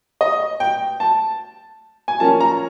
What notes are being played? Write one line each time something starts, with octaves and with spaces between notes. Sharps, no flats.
D#5
G5
A5
G#5
F3 A#3 C#4 A5
A#5